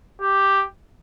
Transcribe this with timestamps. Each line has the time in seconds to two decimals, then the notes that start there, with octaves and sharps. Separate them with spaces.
0.21 G4